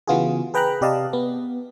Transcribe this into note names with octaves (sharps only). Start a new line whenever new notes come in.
C#3 E3 B3 F4 F#4 G#4
G#4 B4 G5 A#5 B5 F#6
C3 G4 D5 D#5 F5 A5
B3